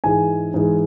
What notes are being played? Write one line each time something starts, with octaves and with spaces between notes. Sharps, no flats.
G#2 E3 G#3 G#5
G#2 E3 G#3